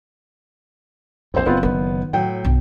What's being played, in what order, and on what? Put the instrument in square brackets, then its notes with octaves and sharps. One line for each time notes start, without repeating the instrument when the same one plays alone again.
[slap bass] A#1 F2 [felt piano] C4 C5
[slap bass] F#1 [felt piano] B3 C4 F4
[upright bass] D#3 D#4 [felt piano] B3
[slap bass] A2 [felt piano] F#3 G5
[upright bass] B1 G2